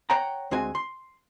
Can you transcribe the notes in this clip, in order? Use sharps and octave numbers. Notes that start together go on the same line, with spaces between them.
C#5 F#5 G5 A#5
D2 G#3 C4 F#4 G#5
C6